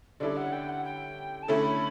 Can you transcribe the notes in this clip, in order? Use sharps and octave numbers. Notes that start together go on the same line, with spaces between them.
D3 G3 C#4 E4 A4 D5
F#5
G5
F#5
G5
A5
D3 A3 C#4 E4 A4 B5